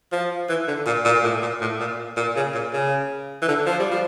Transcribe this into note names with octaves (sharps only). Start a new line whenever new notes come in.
F3
E3
D3
A#2
A#2
A2
A#2
A2
A#2
A#2
C#3
A#2
C#3
E3
D3
F3
G3
F3